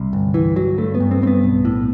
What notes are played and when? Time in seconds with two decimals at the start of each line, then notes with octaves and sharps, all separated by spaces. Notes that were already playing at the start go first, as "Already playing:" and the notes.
Already playing: C2
0.13 G1
0.34 G1 E3
0.56 G1 F#3
0.78 G2 A3
0.95 B3
1.00 G2
1.11 C4
1.22 G2 C4
1.27 B3
1.43 B1
1.65 A2